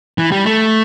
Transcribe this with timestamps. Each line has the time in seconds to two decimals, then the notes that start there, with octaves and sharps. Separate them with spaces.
0.18 E3
0.32 G3
0.45 A3